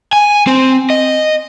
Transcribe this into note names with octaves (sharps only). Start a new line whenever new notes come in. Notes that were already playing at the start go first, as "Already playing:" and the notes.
G#5
C4
D#5